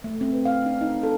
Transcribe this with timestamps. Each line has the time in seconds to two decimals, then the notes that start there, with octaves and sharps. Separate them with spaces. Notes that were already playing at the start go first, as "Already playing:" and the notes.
0.04 A3
0.21 C4
0.33 B4
0.45 F5
0.66 D4
0.81 D#4
1.03 A4